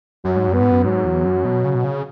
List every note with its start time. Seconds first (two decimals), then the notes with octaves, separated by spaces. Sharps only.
0.25 F#2 F#3
0.36 G#2
0.48 F#2
0.54 B3
0.60 G#2
0.71 F#2
0.85 G#2 F#3
1.05 E2
1.25 F#2
1.45 B2
1.64 C#3
1.75 B2
1.84 C#3